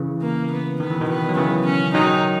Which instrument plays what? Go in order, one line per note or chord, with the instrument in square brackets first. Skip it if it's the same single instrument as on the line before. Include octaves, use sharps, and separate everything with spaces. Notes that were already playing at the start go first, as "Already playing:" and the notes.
Already playing: [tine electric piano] C#3 E3
[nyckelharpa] A#3
B3
[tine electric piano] D#3 [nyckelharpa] B3
[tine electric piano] E3
B2 D#3
[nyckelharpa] B3
[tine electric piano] F#3
[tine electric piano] C#3 E3 [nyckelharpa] B3
[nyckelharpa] C#4
[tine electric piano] D#3 F#3 [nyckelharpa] D#4